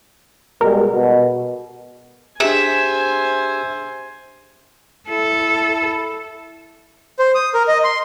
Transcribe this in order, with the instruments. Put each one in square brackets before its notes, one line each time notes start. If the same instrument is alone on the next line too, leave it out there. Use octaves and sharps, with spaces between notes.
[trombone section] B2 G3 G#3 [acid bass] A#4
[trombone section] B2
[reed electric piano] D4 G4 G#4 [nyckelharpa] C5 G#5 [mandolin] E5
[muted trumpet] E4 [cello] A4
[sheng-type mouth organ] C5
D#6
A#4
D#5
C6